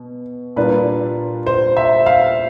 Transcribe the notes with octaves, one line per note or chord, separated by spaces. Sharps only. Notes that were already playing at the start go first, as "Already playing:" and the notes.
Already playing: B2
A#2 G3 A#3 D4 F4 B4
C5
E5
F5